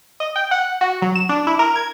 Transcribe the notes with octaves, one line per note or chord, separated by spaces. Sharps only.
D#5
G5
F#5
F#4
F#3
E7
D4
E4
A#4
G#6